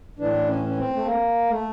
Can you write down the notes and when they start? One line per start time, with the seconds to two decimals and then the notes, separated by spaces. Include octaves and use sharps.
0.19 A2 E3 D4
0.48 C#4
0.67 C#4
0.77 C4
0.95 A3
1.05 A#3
1.49 A3